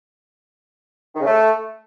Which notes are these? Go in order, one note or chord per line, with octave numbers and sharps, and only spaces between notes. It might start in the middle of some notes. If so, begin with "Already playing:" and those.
D#3
C#3
A3